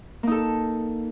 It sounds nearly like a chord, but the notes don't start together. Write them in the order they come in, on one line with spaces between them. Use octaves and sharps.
A#3 D#4 A4